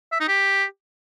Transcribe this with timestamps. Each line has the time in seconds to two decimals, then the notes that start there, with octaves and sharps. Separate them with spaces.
0.12 E5
0.20 D#4
0.28 G4